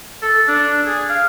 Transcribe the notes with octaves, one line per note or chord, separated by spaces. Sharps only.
A4
D4
G#4
F5